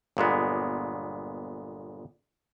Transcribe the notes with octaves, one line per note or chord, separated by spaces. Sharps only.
G1 A#2 G#3 B3